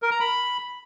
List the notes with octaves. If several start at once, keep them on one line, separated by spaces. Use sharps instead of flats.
A#4
A#5
B5